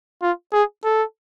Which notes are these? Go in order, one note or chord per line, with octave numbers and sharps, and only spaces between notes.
F4
G#4
A4